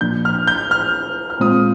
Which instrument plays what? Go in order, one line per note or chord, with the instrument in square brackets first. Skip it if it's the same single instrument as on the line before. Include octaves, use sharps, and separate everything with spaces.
[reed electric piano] A#2 F3 A#3 D4 [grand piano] G6
[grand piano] F6
G6
F6
F6
[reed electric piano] A#2 G#3 C4 F4 [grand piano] D#6